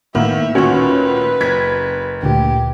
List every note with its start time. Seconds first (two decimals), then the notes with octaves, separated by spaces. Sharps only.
0.15 A2 D#3 A#3 B3 E5
0.55 D2 A#2 D#3 C#4 F#4 B4 C#5
1.40 F#1 G#6 B6
2.23 D2 A#2 G4